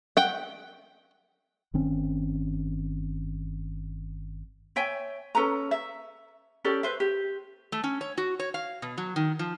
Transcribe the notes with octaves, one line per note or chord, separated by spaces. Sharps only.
F#5 G5
G1 D#3 C4 C#4
C#5 E5 G5 G#5
C#4 A4 B4 A#5
E5
C#4 G4 A4 D5
B4 C5 E5
G4
A3
C#4
C#5
F#4
C#5
F5
B2
F#3
D#3
F3